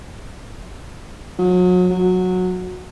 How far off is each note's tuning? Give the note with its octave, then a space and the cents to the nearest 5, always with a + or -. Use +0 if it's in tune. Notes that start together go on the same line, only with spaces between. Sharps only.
F#3 -35
F#3 -15